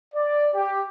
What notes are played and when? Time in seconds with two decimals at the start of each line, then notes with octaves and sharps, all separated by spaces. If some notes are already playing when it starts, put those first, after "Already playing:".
0.15 D5
0.54 G4